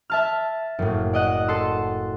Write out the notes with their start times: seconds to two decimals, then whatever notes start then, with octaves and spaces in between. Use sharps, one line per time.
0.10 E5 A5 F6
0.79 F#1 A2
1.13 D5 D#5 F#5
1.48 A4 C6 E6